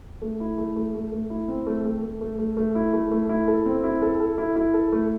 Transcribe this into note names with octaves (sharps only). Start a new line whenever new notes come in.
A3
E4
A3
A3
A3
A3
E4
C4
A3
A3
A3
A3
A3
A3
E4
A3
A3
E4
A4
C4
E4
A4
A4
E4
E4
A4
A3